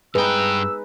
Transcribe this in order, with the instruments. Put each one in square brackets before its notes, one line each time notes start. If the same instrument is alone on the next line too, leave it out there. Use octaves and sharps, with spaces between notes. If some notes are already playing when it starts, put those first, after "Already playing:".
[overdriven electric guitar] G2 G5 [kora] G#3 D#4 [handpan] B4 [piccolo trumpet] E6